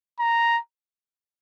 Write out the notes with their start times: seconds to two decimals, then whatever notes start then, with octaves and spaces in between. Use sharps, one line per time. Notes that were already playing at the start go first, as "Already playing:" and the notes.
0.20 A#5